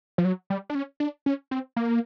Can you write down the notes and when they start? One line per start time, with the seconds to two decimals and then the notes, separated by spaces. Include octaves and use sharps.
0.18 F3
0.25 F#3
0.50 G3
0.70 D4
0.75 C#4
1.00 D4
1.26 C#4
1.51 C4
1.76 A#3